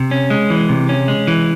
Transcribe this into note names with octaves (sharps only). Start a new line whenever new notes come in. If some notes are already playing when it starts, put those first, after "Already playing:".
Already playing: C3
C#4
G#3
E3
C3
C#4
G#3
E3